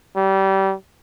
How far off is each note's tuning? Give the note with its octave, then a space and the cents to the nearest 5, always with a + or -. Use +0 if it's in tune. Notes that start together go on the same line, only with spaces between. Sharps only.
G3 -25